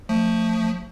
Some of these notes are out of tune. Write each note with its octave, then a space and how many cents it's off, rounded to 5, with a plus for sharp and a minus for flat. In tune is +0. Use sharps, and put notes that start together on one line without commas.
F3 +15 A3 +25